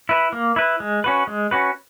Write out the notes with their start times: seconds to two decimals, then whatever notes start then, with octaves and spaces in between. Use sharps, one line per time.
0.09 E4 B4
0.33 A#3
0.56 E4 B4
0.80 G#3
1.04 C#4 F#4 B4
1.27 G#3
1.51 C#4 F#4 B4